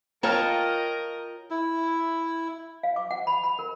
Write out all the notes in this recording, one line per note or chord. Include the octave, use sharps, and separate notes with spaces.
F4 A#4 C#5 D#5 G5 A5 A#5 F6
E4
F5
D6
F#5
B5
B5
A#4